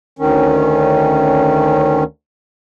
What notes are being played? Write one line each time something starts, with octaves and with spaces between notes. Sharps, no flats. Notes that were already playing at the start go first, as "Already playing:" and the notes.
D2 D#3 C#4